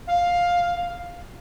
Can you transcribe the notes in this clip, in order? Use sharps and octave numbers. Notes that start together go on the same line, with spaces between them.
F5